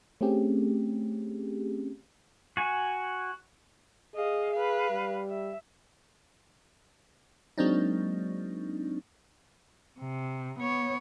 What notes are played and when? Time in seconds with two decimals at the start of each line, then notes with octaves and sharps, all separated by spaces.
0.21 A3 C4 C#4 G4 G#4
2.57 F#4 G#5
4.15 G#4 D#5 F5
4.53 B4 F5
4.90 G3
5.29 E5
7.58 F#3 G#3 A#3 C4 D4 D#4
10.00 C3
10.59 B3 C#5